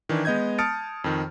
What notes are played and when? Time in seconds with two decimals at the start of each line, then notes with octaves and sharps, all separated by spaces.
0.09 D#3 E3 D4 E4
0.25 G#3 B3 D#5 G6 G#6
0.58 A5 D#6 F6 A6 C#7 D7
1.04 F2 D#3